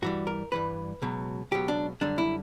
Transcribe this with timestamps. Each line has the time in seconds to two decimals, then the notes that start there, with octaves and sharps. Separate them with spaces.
0.02 G2 E3 G3 F#4
0.27 A#4
0.52 G2 E3 G3 B4
1.02 C#2 B2 F#3
1.51 C#2 B2 F#3 G4
1.68 D4
2.01 F#2 D3 G3 D4
2.18 E4